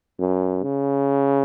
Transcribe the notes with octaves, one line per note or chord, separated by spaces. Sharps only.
F#2
C#3